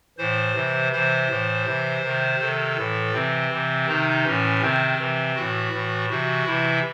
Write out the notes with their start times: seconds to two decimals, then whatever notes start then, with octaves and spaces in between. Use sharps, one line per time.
0.18 A2 E3 C5
0.55 C3 E3
0.92 C3 E3 C5
1.29 A2 E3
1.66 C3 E3
2.03 C3 D#3
2.40 C3 D#3 A4
2.77 A2 E3
3.14 C3 E3 C4
3.51 C3 E3
3.88 C3 D#3 D#4
4.25 A2 E3 C#4
4.62 C3 D#3 C4
4.99 C3 E3
5.36 A2 E3 F#4
5.72 A2 E3
6.09 C3 E3 F#4
6.46 C3 E3 E4